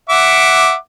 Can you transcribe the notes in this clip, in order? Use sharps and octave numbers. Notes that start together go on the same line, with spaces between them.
E5 F#5 D6